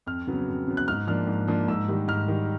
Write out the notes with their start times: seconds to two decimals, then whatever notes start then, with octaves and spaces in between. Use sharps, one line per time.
0.06 F2 F6
0.27 C#3 F#3 B3
0.47 F2
0.67 C#3 F#3 B3
0.77 F#6
0.88 G#2 F6
1.07 F3 A#3 D4 F6
1.27 G#2
1.48 F3 A#3 D4
1.68 G#2 E6
1.88 D#3 G3
2.08 G#2 F6
2.28 D#3 G3